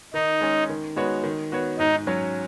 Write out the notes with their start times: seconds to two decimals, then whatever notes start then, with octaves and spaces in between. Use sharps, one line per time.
0.14 D#3 D#4
0.41 G#3 C#4
0.69 D#3
0.96 G#3 B3 F#4 C#5
1.24 D#3
1.52 B3 F#4 C#5
1.79 G#2 D#4
2.07 F#3 C#4